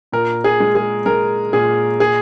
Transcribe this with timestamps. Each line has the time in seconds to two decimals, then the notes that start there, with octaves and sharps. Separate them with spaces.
0.12 A#2 A#4
0.44 G#4
0.60 G#3
0.75 G#4
1.06 G#3 A#4
1.53 A#2 G#4
2.00 G#4